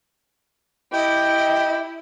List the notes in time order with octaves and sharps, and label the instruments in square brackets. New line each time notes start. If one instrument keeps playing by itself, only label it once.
[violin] E4 [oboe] G4 [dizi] D#5 [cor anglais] G5